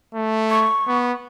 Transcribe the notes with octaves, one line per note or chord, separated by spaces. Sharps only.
A3
C#6
B3